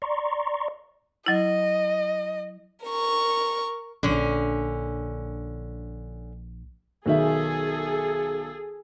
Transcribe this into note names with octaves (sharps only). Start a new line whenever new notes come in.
D5 A#5 C6 C#6
F#3 E4 D#5
A#4 C#6
A#1 D3 C#4
B1 D#3 G#4 A4 E5